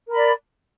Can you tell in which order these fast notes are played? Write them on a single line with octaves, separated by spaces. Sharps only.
A#4 B5 D5